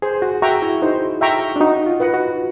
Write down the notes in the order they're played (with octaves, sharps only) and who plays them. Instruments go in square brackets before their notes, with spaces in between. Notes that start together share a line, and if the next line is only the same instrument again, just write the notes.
[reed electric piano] G#4 [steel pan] C5
[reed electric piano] F#4
[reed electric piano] F#4 [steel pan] E5 G5 A#5 C#6
[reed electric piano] E4
[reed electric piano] D#4 [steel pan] C5
[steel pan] E5 G5 A#5 C#6
[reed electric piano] D4
[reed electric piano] D#4 [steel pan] F#4
[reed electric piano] F4
[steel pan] B4 D#5 F#5
[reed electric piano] F#4